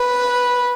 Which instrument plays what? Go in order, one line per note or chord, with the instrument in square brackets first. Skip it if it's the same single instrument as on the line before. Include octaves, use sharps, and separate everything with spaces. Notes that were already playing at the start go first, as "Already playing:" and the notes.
Already playing: [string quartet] B4